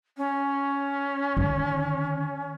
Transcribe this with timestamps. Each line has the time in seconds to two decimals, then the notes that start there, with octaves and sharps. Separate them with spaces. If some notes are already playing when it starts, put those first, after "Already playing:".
0.17 C#4
1.37 D3 D#3